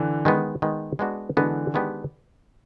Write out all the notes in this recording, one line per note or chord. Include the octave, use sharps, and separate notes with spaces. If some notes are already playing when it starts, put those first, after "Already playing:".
Already playing: D3 E3
D#3 G#3 B3
D#3 G#3 B3
G#3 B3 D4 F#4
D3 E3 G#3 B3 D4 F#4
D#3 G#3 B3 D4 G4